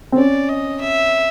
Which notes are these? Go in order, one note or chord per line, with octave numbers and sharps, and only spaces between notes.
C4
C#4 D5
D#5
E5